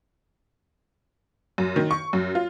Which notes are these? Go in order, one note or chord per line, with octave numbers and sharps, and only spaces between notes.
F#2
D#3
C#6
F#2
F4